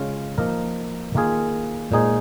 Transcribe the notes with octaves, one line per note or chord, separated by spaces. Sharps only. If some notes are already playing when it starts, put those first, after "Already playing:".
Already playing: C#3 G#3 C#4 F4
F3 A#3 D#4 A#4
D#3 A#3 F4 G#4
A#2 G#3 D#4 G#4 C5